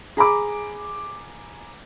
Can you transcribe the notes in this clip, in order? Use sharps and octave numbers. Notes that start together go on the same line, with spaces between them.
G#4 A#5 B5 D6